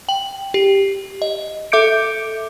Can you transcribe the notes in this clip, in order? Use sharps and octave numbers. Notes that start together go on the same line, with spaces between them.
G5 F#7
G4
D#5
A4 E5 D6 G6 C#7 D7